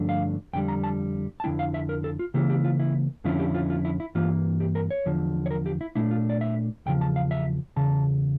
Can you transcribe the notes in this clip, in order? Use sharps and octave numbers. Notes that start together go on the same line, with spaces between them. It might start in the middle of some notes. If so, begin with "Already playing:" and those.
Already playing: G2 D3 F3 A3 D4
F5
F2 D3 G3 G5
A#5
A5
A5
F2 D3 A3 E4 G5
F5
E5
A#4
A4
F4
C#3 E3 A#3 E4 G4
G4
F4
E4
F2 D3 F3 C#4 E4 F4
G4
F4
F4
E4
E4
G2 E3 A#3 F4
G4
A#4
C#5
E2 D3 F3
C#5
A#4
G4
E4
A#2 A3 D4 E4
F4
D5
E5
E2 C#3 F3 G5
A5
F5
E5
E2 C#3 A5